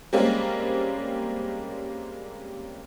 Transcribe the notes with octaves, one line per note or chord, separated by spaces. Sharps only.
G3 G#3 A#3 C4 C#4